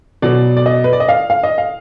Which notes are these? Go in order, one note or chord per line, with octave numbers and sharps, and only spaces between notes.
B2 F#3 D5
D5
D#5
B4
D5
D#5
F5
F5
D#5
F5